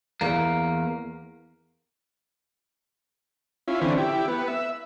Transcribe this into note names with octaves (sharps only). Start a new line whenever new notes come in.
E2 A#3
C#4 E4 F4
D3 E3 C4 C#4
E4 G4
B3
E5